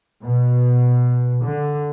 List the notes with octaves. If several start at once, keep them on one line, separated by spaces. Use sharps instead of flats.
B2
D3